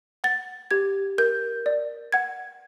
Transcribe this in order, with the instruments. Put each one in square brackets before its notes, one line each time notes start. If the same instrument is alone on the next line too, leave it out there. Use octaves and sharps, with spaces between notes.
[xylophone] F#5 A6
G4 G#6
A#4 G6
D5
F#5 G#6